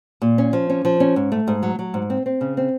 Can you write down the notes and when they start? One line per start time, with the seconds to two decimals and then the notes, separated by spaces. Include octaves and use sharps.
0.22 A#2
0.38 C#4
0.53 F3
0.70 C#4
0.85 F3
1.00 C#4
1.16 G#2
1.32 A3
1.48 G#2
1.63 F#3
1.79 F#3
1.94 G#2
2.10 C4
2.26 C4
2.41 C#3
2.57 C4